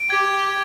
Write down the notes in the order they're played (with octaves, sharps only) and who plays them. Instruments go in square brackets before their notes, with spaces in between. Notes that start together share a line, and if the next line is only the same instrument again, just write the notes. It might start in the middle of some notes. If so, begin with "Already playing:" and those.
Already playing: [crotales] D7
[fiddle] G4 [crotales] G#6